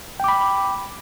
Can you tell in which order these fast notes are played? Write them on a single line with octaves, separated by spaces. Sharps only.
G5 D6 B5